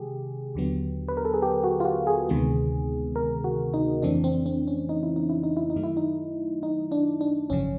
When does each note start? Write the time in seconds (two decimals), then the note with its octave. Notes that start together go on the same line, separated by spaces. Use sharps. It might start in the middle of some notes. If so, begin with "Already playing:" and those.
Already playing: C3 D#3 G#3 G4 G#4
0.55 D#2 D3 F#3 B3
1.08 B4
1.17 A#4
1.25 A4
1.33 G#4
1.42 G4
1.64 F#4
1.80 F4
1.85 F#4
2.07 G#4
2.29 D2 C3 D#3 G#3 B3
3.16 A#4
3.44 F#4
3.74 D#4
4.02 F2 C#3 E3 A3 C4 D4
4.24 C4
4.46 C4
4.68 C#4
4.89 D#4
5.03 E4
5.16 D#4
5.29 E4
5.43 D#4
5.57 E4
5.70 D#4
5.76 F#2 D#3 F#3 A3
5.83 E4
5.97 D#4
6.63 D#4
6.92 D4
7.21 D4
7.50 G#1 F#2 C#3 F3 C#4